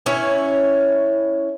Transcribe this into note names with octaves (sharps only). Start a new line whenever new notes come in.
C#4 E4 C#5 G#5